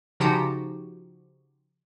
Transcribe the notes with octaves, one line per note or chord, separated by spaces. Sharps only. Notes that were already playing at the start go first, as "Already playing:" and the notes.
C#3 F3 D#4 F#4 G4